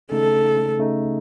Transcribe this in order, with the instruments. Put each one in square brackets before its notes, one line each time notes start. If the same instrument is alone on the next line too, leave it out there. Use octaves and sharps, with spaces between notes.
[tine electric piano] C#3 A3 D#4 [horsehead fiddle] A4
[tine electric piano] C#3 A3 D#4